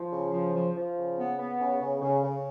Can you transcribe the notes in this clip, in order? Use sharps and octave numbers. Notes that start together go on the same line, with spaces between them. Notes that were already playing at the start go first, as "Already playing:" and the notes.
Already playing: F3
C#3
F3
F3
F3
C#3
B3
B3
C#3
C#3
C#3
C#3